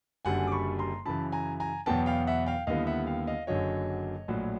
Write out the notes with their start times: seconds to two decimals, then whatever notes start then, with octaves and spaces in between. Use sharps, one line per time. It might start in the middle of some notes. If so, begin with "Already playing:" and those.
0.25 F#1 F#2 D3 G3 F#5 G#5
0.47 D6
0.52 B5 C#6
0.79 A#5 C6
1.05 F#2 C#3 E3 A5 B5
1.32 G#5 A#5
1.60 G#5 A#5
1.86 E2 B2 F#3 B3 G5 A5
2.06 F5 G5
2.27 E5 F#5
2.46 F5 G5
2.67 D#2 D3 G3 B3 E4 D#5 F5
2.87 E5 F#5
3.07 F5 G5
3.27 D#5 F5
3.47 F#1 F#2 D3 F#3 C#5 D#5
4.28 A#1 A2 F#3